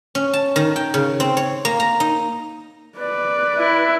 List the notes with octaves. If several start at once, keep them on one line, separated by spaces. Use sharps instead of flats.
C#4
A5
D#3
G5
C#3
C4
C#5
A#3
A#5
D#4
B4 D5
E4